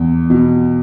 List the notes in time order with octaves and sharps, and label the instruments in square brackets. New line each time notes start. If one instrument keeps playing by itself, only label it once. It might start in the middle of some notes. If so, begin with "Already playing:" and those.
Already playing: [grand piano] E2
B2